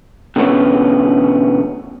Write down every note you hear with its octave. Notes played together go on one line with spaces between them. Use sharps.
B2 D3 E3 A3 B3 C#4